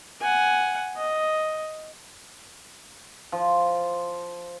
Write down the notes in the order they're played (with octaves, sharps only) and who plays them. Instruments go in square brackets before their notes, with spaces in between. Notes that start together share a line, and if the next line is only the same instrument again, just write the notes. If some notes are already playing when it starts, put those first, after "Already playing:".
[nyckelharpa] F#5 G#5
D#5
[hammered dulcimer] F3